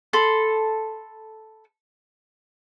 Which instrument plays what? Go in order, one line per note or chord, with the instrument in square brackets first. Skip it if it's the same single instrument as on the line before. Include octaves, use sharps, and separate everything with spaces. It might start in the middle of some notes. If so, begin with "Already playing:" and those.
[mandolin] A4 B5 C6